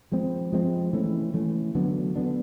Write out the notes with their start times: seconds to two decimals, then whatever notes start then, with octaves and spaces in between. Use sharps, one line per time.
0.12 F3 G#3 C4
0.52 F3 G#3 C4
0.93 E3 A3 C#4
1.34 E3 A3 C#4
1.75 D3 F#3 B3 D4
2.16 D3 F#3 B3 D4